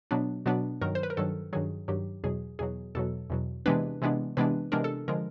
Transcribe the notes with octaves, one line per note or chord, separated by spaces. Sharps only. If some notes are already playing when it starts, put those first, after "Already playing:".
B2 F#3 B3 D4
B2 F#3 B3 D4
G2 D#3 F#3 A#4
C5
B4
A#4
G2 D#3 F#3 A4
G2 D#3 F#3 G#4
G2 D#3 F#3 G4
E2 B2 F#3 G#4
E2 B2 F#3 G#4
E2 B2 F#3 A4
E2 B2 F#3
C3 E3 G#3 B3 D4 B4
C3 E3 G#3 B3 D4
C3 E3 G#3 B3 D4 B4
C3 E3 G#3 B3 D4 A#4
A4
D3 F3 G#3 A#4